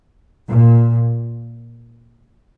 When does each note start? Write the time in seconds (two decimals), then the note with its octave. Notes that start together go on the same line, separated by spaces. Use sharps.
0.49 A#2